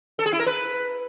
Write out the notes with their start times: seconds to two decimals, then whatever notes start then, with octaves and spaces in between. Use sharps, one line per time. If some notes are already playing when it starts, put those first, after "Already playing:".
0.19 A4
0.26 G#4
0.33 E4
0.40 A#4
0.46 B4